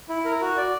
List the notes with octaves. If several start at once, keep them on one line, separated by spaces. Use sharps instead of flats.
E4
A#4
F#4
D5